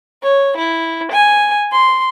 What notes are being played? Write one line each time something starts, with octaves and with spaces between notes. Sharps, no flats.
C#5
E4
G#5
C6